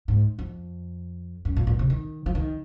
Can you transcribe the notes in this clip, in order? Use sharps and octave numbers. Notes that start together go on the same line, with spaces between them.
G#2
F2
F#2
A#2
A#2
C3
D#3
F3
D#3